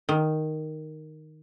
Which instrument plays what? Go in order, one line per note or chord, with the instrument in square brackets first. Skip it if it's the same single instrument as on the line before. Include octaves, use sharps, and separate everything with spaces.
[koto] D#3